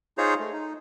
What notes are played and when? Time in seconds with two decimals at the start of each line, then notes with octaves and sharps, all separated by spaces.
0.18 D#4 F4 G#4 C5 C#5 A#5
0.40 A3
0.53 D#4